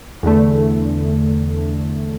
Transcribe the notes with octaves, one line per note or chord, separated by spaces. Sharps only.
E2 D3 A3